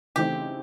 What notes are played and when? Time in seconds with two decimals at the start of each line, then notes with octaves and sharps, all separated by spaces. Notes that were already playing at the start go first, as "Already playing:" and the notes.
0.16 C#3 E3 A3 C4 D#4 G4